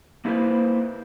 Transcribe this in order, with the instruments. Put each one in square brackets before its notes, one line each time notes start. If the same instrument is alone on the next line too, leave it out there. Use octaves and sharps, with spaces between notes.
[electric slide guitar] A#3 E4 G4 A4 B4 C5